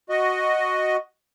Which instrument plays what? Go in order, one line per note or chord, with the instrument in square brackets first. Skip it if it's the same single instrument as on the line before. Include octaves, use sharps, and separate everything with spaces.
[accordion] F#4 D#5